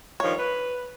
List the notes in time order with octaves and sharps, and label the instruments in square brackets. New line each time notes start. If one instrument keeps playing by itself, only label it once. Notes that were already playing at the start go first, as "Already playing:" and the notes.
[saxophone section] G2 D#3 F3 [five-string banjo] C#5
[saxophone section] B4